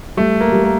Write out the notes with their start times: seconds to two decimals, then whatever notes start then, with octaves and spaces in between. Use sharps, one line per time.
0.17 G3 A3
0.40 A#3
0.52 G3
0.64 A#3